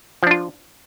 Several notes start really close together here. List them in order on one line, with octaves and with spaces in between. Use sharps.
F3 D4 F4